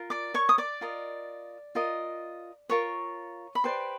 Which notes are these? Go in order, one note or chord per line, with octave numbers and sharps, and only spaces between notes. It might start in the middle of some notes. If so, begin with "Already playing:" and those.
Already playing: F4 A#4
D5 D6
C#5 C#6
D#6
D5 D6
F4 A#4 D#5
F4 A#4 D#5
F4 A#4 C#5 C#6
B5
G4 B4 C5 D5 C6